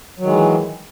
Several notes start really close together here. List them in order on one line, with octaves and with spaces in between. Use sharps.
F#3 D#3 G#3 E3